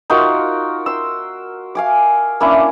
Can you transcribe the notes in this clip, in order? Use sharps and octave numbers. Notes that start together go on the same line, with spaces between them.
D#4 F4 F#4 A#4
C6 E6
F5 G#5 D6
A#3 C#4 D4 E4